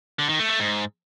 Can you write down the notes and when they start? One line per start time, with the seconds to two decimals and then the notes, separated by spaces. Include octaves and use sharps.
0.19 D3
0.29 D#3
0.39 A3
0.50 A3
0.60 G#2